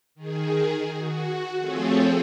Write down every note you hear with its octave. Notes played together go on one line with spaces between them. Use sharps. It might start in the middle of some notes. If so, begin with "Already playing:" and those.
D#3 G#4
F#4
F3 A3 C4 G#4 A4 C#5